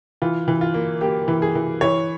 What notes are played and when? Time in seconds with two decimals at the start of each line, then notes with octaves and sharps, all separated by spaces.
0.22 E3 F4
0.48 E3
0.61 F4
0.74 A#3
1.01 A#3 G4
1.28 E3
1.42 G#4
1.55 E3
1.81 E3 C#5